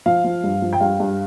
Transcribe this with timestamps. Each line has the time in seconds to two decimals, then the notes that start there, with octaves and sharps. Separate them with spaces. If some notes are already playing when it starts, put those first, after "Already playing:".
0.06 F3 F5
0.24 F3
0.44 G2
0.62 F3
0.73 G5
0.81 G2 F5
1.00 G2